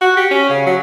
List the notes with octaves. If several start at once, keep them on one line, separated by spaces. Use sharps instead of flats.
F#4
G4
C#4
C#3
F#3